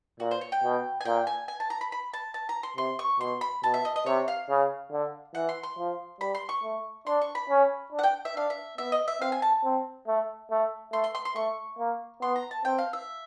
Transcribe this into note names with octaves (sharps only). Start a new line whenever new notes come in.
A#2 F#4
C5
C#5
G5
B2
G#5
A#2 G5
G#5
G#5
A5
A#5
B5
B5
A5
A5
A#5
C6
C3 C6
C#6
B2 C6
B5
B2 A5
E5
D#5
D#5
C3 C#5
F5
C#3
D3
E3 F#5
C6
C6
F3
G3 B5
C6
C#6
A3
D4 C6
C#6
B5
C#4
D4
F#5
G5
E5
D4 F5
E5
B3 E5
D#5
E5
C4 F5
G#5
A5
C4
A3
A3
A3 C6
C6
C6
C6
A3 C#6
A#3
B3 C6
A#5
A5
C4 G5
F5
E5